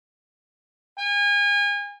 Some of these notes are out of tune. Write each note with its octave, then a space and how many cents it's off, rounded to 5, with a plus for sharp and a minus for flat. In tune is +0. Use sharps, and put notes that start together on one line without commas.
G#5 -35